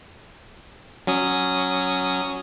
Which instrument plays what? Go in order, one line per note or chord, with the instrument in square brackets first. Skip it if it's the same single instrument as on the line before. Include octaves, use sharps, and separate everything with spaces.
[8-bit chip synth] F#3 C#4 D#6